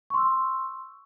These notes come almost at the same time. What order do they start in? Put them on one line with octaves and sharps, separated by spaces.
C#6 C6 E6